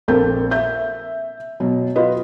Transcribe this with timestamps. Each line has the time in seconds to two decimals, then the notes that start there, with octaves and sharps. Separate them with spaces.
0.08 A#1 C4 A4 A#4 G6
0.51 E5 G6
1.60 B2 F#3
1.96 F4 F#4 B4 D#5